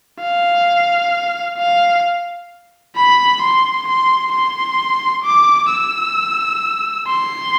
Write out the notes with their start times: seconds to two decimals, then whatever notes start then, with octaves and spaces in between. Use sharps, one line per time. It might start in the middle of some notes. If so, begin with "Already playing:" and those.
0.21 F5
1.58 F5
2.96 B5
3.42 C6
3.88 C6
4.33 C6
5.25 D6
5.71 E6
7.08 C6